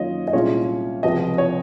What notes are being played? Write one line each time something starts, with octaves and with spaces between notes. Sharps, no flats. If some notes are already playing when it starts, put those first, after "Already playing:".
Already playing: F#2 D#3 A#3 C#4 F4 C#5 D#5
D#5
C2 A#2 G#3 C#4 F4 C#5
C#2 C3 F3 D#5
C#5